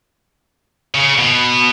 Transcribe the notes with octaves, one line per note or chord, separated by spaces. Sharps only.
C#3
B2